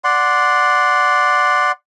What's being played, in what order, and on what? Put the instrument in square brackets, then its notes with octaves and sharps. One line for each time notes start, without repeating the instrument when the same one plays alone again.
[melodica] D5 F#5 C6